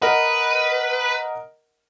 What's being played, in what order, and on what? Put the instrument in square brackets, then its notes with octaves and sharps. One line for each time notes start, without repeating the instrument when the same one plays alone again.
[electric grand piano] A#4 D#5 F#5 [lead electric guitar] B4